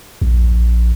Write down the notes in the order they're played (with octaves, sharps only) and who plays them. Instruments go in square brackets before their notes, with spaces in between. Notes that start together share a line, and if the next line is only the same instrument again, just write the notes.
[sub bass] A#1